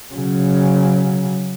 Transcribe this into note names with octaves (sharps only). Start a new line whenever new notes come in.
C#3 F#3